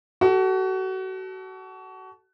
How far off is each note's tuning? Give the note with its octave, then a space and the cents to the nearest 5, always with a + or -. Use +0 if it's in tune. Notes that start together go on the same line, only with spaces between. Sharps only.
F#4 +30 A4 -15